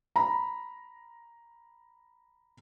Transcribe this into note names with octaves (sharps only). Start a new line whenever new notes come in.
A#5 B5